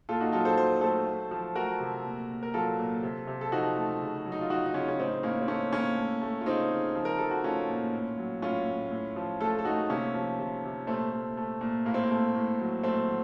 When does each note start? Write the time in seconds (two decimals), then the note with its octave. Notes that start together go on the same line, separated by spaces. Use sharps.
0.09 A#2 F4 A4
0.20 D#4 F#4
0.32 F#3 F4 A4
0.45 A4 C5
0.57 F#3 C5
0.81 A3 A4 C5
1.07 A3
1.31 F3
1.55 A3 F#4 A#4
1.80 C3
2.04 A#2
2.29 A#2
2.43 A#4
2.54 F#3 F4 A4
2.79 A#2
3.03 C3
3.27 C3
3.41 A4
3.52 F3 D#4 F#4
3.77 A3
4.01 C#3
4.25 F#3
4.32 D#4
4.41 F4
4.50 F#3 D#4 F#4
4.66 D#4
4.74 C#3 C#4 F4
4.88 C#4
4.99 A2 C4 D#4
5.23 A2 A#3 C#4
5.41 C4
5.48 A3 A#3 C#4
5.72 A2 A#3 C#4
5.97 A3
6.22 A3
6.41 F4
6.46 C#3 C4 D#4
6.71 C#3
6.95 F3
7.05 A#4
7.18 F3 A4
7.31 F#4
7.44 A3 C#4 F4
7.69 A#2
7.94 A2
8.18 F#3
8.42 A2 C#4 F4
8.67 A2
8.91 A2
9.16 F3
9.40 A3 F4 A4
9.59 A4
9.65 A3 D#4 F#4
9.89 C3 A#3 C#4
10.14 F3
10.39 C3
10.64 C3
10.87 A#2 A3 C4
11.12 A3
11.37 A3
11.61 A#2
11.86 A2 A#3
11.94 C4
12.04 A#3
12.10 A3
12.35 A2
12.60 F#3
12.84 A#2 A3 C4
13.08 F#3